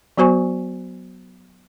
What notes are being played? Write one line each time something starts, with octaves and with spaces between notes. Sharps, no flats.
F#3 B3 F#4 C5 G#5 C#6